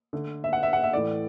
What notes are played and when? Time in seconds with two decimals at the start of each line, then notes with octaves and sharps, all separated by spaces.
0.13 D3 A3
0.44 E5
0.53 F#5
0.63 E5
0.73 F#5
0.83 E5
0.93 A2 E3 A3 D5